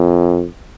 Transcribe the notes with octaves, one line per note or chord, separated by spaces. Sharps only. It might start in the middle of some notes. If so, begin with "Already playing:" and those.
Already playing: F2